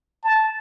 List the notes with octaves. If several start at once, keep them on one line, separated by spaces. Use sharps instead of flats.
A5